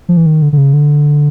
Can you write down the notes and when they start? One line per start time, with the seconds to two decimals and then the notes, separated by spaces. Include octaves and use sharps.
0.09 F3
0.17 E3
0.26 D#3
0.42 D3
0.53 D3
0.58 C#3
0.73 D3